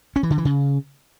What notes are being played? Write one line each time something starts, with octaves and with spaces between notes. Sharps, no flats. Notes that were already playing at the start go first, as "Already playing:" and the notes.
C#4
E3
D3
E3
C#3